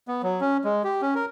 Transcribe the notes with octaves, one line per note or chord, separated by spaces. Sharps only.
B3
F#3
C#4
G#3
G4
C#4
A#4